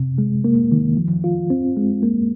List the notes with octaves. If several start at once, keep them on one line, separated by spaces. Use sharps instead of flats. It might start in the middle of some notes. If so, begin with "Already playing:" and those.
Already playing: C3
G#3
A#3
D#3
F3
F4
C4
G#3
A#3